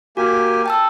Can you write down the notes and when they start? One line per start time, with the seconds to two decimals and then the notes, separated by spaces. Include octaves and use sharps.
0.17 A#3 F#4 G4 G#5
0.66 G5 A5 E6